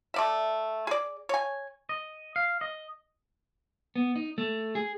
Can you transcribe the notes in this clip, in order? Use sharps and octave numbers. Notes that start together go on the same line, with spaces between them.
A3 D5 E5
G#4 D5
C#5 G#5
D#5
F5
D#5
B3
D#4
A3
G#4